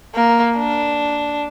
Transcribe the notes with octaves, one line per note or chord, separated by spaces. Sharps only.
A#3
D4